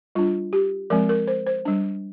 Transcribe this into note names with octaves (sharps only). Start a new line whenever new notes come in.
G3 D4 F4
G4
F3 G#3 C4 A#4
A#4
C5
C5
G3 D4